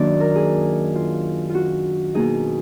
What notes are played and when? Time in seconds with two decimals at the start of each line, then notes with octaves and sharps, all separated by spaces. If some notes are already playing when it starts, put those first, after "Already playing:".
Already playing: F#2 D#3 A#3 D4 D5
0.20 A#4
0.36 G#4
0.95 F4
1.49 F4
1.54 F#4
2.14 B2 A#3 D#4 G#4